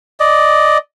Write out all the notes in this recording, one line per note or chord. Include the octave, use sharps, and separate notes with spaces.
D5 D#5